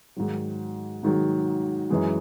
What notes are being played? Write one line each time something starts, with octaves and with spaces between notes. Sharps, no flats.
G#2 D#3 F#3
G#2 D#3 F#3
F#2 E3 G#3